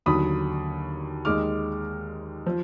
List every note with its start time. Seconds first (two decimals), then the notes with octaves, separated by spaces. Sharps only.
0.06 D#2 D3 F#3 B5 D#6
1.25 D#2 D#3 G#3 D#4 D6 F6
2.47 F3